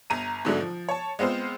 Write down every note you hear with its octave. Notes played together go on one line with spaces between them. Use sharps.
G1 A#5 D#7
G#2 B2 D3 F#3 A3
F3
C#5 A5
G#3 B3 C4 F4 C5